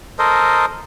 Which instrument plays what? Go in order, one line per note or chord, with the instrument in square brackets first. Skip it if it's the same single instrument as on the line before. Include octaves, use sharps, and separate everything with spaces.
[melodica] A4 A#4 C5 D#5